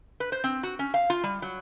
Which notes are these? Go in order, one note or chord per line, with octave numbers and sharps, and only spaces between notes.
B4
C5
C4
F#4
C#4
F5
F4
G3
F#3